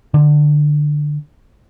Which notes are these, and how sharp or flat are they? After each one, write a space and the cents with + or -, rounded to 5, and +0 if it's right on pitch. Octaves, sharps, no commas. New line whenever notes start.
D3 +15